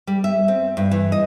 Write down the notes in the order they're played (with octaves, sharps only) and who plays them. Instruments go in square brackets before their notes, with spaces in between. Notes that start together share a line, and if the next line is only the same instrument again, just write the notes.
[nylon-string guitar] G3
E5
C4
G2
E3
D#5